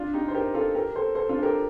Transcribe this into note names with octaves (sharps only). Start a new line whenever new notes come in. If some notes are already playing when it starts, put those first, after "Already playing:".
Already playing: D4 F4
D#4 G4
C5
G4 A#4
F4 A4
G4 A#4
A4 C5
A4 C5
D4 F4
A4
G4 A#4